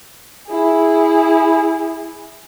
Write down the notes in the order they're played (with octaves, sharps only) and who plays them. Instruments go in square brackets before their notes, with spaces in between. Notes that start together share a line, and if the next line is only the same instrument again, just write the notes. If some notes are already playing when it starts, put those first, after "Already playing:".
[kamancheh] E4 G#4